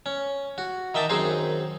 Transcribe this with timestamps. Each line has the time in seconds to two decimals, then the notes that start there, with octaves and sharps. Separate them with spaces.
0.06 C#4
0.58 F#4
0.94 D#3 D#5 E5 G5 A5 D6
1.10 F#2 D#3 C4 D#4 G#4 C5